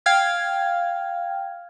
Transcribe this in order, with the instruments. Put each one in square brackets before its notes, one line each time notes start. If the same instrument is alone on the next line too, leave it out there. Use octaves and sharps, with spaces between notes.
[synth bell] F5 G5 F6 G#6